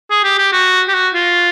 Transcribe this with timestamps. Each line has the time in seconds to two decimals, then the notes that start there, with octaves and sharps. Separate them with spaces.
0.11 G#4
0.24 G4
0.38 G4
0.52 F#4
0.88 G4
0.94 F#4
1.14 F4